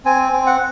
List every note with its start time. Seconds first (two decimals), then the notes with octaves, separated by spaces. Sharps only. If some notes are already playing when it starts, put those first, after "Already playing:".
0.05 C4 G#5
0.32 C4
0.46 F#5